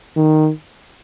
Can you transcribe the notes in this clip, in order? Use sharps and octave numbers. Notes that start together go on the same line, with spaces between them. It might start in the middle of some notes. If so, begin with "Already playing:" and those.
D#3